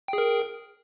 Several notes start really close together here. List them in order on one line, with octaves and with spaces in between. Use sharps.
G5 G#4 A#4